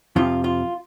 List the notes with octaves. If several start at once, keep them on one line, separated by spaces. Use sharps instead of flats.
F2 C3 F3 F4
F4